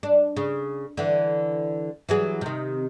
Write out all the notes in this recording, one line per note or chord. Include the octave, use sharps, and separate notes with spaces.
D4
C#3
D3 E3
E3 F#3 G#4
C3 D#3